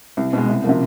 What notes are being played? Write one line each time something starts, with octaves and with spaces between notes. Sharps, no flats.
C2
B2 G#3
C2
C3 F3 A#3